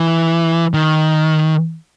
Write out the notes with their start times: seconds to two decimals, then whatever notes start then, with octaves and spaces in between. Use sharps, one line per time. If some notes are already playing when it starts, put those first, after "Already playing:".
Already playing: E3
0.74 D#3